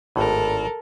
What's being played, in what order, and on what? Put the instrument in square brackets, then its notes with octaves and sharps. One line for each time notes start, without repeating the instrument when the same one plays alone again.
[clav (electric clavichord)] G#1 A2 [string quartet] A4 A#4